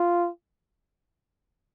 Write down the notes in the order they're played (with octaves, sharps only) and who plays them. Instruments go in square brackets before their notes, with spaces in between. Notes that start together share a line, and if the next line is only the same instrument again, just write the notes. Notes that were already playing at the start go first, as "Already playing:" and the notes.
Already playing: [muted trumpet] F4